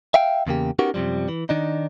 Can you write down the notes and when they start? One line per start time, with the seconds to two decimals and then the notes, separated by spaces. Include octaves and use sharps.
0.14 E5 F5 G5
0.47 E2 C#3 A#3 G4
0.79 B3 C#4 D#4 F#4 G4 A#4
0.94 F#2 C3 D#3 F3 G3
1.28 E3
1.49 D#3 D4 D#4